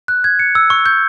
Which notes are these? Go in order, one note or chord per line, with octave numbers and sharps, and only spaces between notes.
F#6
G#6
C#7
E6
C#6
G6